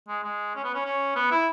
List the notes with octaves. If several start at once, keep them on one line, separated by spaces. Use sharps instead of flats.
G#3
G#3
C#4
B3
C#4
C#4
B3
E4